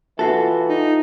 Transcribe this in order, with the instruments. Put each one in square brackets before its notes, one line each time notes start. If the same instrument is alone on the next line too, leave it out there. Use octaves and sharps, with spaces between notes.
[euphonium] E3 [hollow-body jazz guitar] F4 F#4 A4
[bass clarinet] D#4